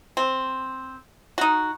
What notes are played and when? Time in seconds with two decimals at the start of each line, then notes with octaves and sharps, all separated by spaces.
0.17 C4
1.38 D#4 F#4